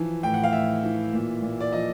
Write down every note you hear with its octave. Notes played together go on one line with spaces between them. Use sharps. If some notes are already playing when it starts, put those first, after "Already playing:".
Already playing: E3 F3
A2 G5
F#5
F5
A2 E5
E3
A#2
A#2
D5
F3 D#5